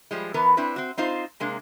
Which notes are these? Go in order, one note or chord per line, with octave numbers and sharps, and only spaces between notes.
F3 G3 G#3
E3 B3 A#4 B4
C4 D4 E4 B4
C4 F#4
C4 D#4 F4 C5
C3 G#3 A#3 D4